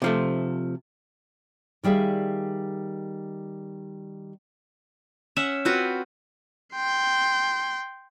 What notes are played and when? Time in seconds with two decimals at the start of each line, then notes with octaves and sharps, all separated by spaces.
0.02 C3 F3 A3
1.83 D#3 G3 G#4 E5 F5
5.37 C#4 E5 F#5
5.65 C4 F4 F#4 B4
6.74 G5 C6